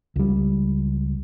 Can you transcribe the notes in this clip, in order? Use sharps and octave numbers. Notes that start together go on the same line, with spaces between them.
C#2 G3